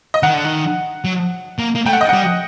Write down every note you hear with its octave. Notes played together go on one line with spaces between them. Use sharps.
D#5
D#3 F#5
D3
D#3
F#3
A#3
A#3
A3 G5
F#5
D#5
G3 F#5